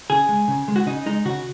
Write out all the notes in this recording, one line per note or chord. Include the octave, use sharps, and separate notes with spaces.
C#3 G#4
G#3
C#3
G#3
F#4
C#3 D#4
G#3 D#4
C#3 F#4